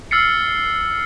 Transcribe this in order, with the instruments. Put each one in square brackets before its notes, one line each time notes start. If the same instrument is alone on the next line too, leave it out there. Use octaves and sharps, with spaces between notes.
[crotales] E6 F6 A6 C7 C#7